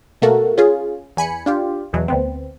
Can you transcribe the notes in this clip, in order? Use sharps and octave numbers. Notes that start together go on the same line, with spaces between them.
B2 A3 A#3 F#4 A4 A#4
C#4 F4 G#4
E2 G#5 B5 C#7
D4 F4 G4
E2 B2 E3 F#3
D2 B3 C4